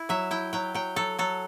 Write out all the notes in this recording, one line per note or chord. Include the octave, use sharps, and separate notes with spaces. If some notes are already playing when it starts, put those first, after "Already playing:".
Already playing: E4
F#3 E5
E4 G5
F#3 G5
F#3 G5
F#3 A4
F#3 A4